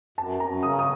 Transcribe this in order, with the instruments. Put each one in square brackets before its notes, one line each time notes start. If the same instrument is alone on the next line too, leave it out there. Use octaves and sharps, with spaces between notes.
[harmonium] F#2 [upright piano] A5
[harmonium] F#2 [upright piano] A#5
[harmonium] C#3 [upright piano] D#6
[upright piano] D#6